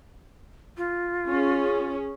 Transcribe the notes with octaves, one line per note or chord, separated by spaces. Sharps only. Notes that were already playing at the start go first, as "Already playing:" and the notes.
F4
C#4 G#4